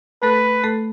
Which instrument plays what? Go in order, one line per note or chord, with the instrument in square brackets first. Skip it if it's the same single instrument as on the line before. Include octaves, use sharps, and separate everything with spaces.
[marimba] A3 A4 [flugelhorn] B4
[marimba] A3 A4